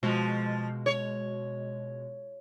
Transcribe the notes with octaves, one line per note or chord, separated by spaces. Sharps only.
B2 F3 G#3
C#5